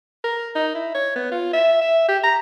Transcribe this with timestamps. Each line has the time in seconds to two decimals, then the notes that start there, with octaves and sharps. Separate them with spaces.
0.24 A#4
0.55 D#4
0.75 E4
0.94 C#5
1.16 B3
1.32 F4
1.53 E5
1.81 E5
2.09 G4
2.23 A#5